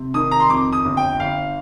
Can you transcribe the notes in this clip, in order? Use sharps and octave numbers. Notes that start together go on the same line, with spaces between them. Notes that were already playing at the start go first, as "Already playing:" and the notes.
Already playing: C3
D#3 D#6
A#5
C6
F2 D6
D#6
G1
G5
G1 F5